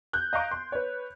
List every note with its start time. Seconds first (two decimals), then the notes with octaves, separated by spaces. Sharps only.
0.13 F#6 G6
0.33 D#5 F5 A#5 C#6 D7
0.51 C6
0.72 B4 C#5